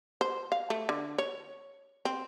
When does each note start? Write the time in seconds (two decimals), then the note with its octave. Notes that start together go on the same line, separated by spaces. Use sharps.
0.21 C5
0.52 F5
0.70 A3
0.89 D3
1.18 C#5
2.05 C4